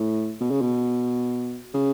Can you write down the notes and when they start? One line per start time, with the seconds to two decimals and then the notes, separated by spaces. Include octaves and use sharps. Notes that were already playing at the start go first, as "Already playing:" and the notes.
Already playing: A2
0.41 B2
0.51 C#3
0.62 B2
1.74 C#3